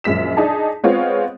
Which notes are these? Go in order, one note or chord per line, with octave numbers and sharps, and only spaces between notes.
A#1 F#2 G#3 B6 E7
D4 D#4 G#4 A5
G#3 B3 C4 F4 C#5 F5